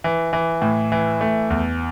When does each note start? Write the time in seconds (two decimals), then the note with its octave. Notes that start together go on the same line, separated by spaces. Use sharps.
0.04 E3
0.33 E3
0.62 A2
0.92 E3
1.21 A3
1.50 E2